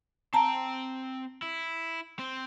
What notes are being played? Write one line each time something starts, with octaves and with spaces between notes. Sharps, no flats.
C4 G5 A5 A#5
E4
C4 C5